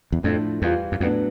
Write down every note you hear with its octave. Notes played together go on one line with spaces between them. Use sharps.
E2
F2 A2 F3 A3 D4
E2 E3 G3 C4 F4
F#2
F2 A2 F#3 B3 D4